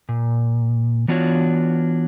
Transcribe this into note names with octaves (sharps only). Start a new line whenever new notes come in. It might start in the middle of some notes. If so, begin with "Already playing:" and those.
A#2
E3 B3 D4 F4 F#4 C#5